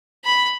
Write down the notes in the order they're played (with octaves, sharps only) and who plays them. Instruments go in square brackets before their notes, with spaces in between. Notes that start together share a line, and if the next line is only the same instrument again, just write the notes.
[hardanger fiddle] B5